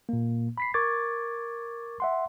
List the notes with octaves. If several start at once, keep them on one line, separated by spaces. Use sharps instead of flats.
A#2 A#3
B5 B6 C7
A#4 C#6 D6 G#6 A6
E5 F#5 C6